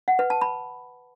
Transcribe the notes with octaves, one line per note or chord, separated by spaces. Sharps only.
F#5
B4
A5
B5